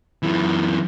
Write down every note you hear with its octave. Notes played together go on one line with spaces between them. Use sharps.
F#2 E3